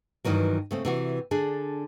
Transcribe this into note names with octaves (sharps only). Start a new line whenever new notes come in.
G2 A#2 D#3 E3 F#3
C#3 A3 C4
C3 E3 F#4
D3 D4 G#4